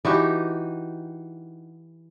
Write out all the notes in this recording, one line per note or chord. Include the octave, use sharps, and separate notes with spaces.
E3 D#4 F#4 G4